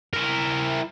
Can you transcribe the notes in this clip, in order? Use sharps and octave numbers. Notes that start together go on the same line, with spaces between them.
E4 A#4